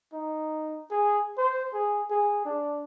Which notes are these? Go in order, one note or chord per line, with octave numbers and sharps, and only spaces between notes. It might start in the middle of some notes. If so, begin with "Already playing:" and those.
D#4
G#4
C5
G#4
G#4
D4